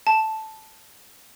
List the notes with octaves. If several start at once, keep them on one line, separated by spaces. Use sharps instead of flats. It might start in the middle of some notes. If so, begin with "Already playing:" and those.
A5